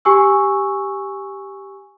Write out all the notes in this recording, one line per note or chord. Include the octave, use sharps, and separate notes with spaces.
G4 G#5 C#6 E6